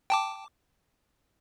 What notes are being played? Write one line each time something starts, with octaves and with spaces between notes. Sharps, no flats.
G5 A5 D6